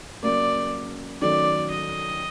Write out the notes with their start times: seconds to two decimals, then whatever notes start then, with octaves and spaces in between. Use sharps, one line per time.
0.23 C#3 F#3 A#3 D5
1.21 D#3 F#3 A3 C#4 D5
1.70 D#5